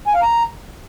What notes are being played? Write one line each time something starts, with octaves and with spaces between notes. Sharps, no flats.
G#5
F5
A#5